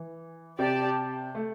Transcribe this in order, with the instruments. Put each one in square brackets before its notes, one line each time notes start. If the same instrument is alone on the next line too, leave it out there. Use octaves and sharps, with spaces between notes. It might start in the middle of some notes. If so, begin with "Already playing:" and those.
Already playing: [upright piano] E3
[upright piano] C3 [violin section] G4 D5 A5
[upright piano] A3